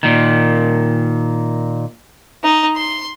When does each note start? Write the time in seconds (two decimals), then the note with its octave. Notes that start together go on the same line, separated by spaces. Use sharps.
0.03 A#2 D#3
2.43 D#4
2.76 C6